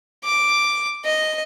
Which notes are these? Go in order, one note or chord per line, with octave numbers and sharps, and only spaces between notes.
D6
D#5